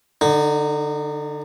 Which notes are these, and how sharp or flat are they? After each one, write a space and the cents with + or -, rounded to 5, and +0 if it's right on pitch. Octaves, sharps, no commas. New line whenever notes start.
D3 +15 D#4 -20